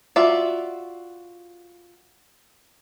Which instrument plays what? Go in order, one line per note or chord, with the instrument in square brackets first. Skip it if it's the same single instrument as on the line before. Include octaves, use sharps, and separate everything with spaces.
[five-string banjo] F4 F#4 D5 E5